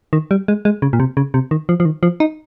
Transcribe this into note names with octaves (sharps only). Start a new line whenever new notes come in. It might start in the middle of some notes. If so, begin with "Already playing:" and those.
D#3
G3
G#3
G#3
C#3
A#2
C3
C#3
C3
D#3
F3
F3
D#3
F3
D#4